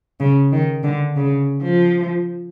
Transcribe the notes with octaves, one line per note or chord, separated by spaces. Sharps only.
C#3
D#3
D3
C#3
F3